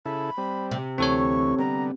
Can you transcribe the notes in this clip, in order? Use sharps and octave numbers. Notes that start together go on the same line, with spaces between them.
C#3 E4 A4 B5
G3 C4
C3
D2 E3 C4 A4 C#5 C#6
D3 G3 B3 A#5